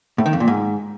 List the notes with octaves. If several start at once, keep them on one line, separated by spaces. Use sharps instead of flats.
A2
D#3
F2
A#2
G#2